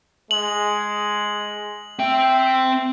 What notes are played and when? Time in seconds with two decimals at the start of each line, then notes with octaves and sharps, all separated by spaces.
0.31 G#3 F#7
1.99 C4 E5 G5